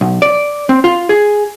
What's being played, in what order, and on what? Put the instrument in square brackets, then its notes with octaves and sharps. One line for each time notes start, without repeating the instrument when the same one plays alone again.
[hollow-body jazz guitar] B1
D5
C4
F4
G#4